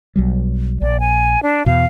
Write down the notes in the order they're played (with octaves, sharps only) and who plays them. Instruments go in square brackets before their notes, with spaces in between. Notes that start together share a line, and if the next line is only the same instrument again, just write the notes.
[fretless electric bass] B1 F#3 G3
[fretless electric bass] A#1 [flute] D5
[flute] G#5
D4
[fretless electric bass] E2 B2 [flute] F5